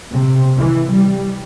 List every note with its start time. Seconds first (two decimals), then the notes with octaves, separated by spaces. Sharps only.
0.12 C3
0.58 E3
0.92 G3